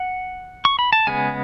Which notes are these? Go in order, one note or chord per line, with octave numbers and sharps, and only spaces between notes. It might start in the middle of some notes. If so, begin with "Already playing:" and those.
Already playing: F#5
C#6
B5
A5
C#3 G#3 B3 G#5